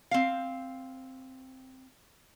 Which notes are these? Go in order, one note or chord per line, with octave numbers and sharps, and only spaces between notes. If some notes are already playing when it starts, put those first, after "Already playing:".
C4 F5